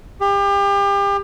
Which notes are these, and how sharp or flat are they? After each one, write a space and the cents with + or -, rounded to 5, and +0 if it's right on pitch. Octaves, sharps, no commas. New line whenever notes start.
G4 +35